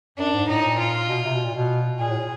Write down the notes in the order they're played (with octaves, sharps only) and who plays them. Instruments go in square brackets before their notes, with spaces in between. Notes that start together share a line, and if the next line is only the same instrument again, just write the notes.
[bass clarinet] F#2 [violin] D4
[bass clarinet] G#2
[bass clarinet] A2 [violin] D#4
[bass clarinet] A#2
[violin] F4
[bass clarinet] B2
C3
B2
A#2
B2
[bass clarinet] A#2 [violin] G#4
[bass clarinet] A2